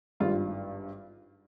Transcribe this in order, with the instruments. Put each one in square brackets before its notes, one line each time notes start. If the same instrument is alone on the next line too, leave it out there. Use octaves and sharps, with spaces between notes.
[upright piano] G#1 G2 G3 F4